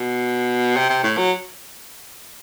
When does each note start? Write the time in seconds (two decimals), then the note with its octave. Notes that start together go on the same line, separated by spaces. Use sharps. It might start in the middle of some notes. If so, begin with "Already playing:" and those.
Already playing: B2
0.76 C3
0.89 C3
1.03 A2
1.17 F#3